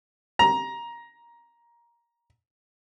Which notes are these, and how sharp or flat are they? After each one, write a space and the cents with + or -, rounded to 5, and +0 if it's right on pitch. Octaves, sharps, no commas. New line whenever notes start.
A#5 +15